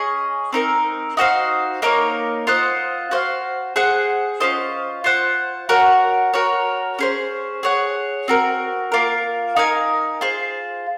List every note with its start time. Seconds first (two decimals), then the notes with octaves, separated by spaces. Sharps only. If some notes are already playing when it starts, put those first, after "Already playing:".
Already playing: C#4 G#4 D#5 G#5
0.52 C4 D#4 A#4
1.17 D#4 F#4 C5 F5
1.82 A#3 D#4 A#4 C#5
2.47 F4 C5 D#5 F#5
3.11 F#4 C5 F5
3.76 G#4 C5 F#5
4.40 C#4 F4 C5 D#5
5.04 F4 C5 F#5
5.69 F#4 A#4 C#5 F#5
6.33 F#4 A#4 C#5
6.99 C#4 G#4 C5
7.63 G#4 C#5 F#5
8.28 C4 F#4 A#4
8.92 A#3 F4 A#4
9.56 D#4 A#4 F5 G#5
10.21 F4 G#4 C5